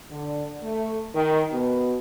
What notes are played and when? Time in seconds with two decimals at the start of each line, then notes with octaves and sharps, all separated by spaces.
0.11 D3
0.62 A3
1.15 D#3
1.52 B2